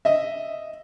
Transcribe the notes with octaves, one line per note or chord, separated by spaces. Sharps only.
D#5 E5